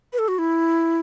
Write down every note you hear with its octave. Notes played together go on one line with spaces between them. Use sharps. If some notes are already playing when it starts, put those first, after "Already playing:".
B4
A4
F#4
E4